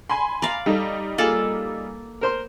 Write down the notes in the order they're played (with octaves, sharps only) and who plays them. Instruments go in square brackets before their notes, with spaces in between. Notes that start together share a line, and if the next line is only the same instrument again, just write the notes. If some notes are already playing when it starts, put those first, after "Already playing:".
[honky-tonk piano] G#5 B5 C6
[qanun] D5 F5 [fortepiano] A#5
[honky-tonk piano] G3 D#4 [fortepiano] A4
[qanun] A#3 A4 D5 [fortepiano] F4 G#4
[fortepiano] A#4 C5 C6